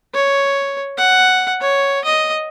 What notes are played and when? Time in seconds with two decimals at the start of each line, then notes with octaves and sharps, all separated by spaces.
0.14 C#5
0.98 F#5
1.61 C#5
2.04 D#5